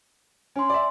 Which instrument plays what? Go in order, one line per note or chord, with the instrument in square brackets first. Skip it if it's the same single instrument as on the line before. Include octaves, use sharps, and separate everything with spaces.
[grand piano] C#4 [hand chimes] G#5 C6
[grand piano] D5 E5